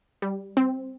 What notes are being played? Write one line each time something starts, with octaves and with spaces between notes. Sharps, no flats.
G3
C4